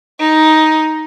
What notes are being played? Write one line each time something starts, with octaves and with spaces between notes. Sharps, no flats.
D#4